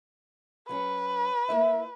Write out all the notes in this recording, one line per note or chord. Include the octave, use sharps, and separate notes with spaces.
F#3 C#4 G#4 B4
A#3 E4 E5